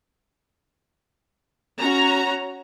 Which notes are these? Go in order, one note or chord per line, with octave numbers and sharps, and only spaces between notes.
C#4 F#4 A#5